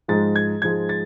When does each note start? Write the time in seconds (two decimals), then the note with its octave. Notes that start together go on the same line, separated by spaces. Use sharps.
0.08 G#2 F3 G#3 A6
0.36 G#6
0.62 G#2 F3 G#3 G#6
0.89 A6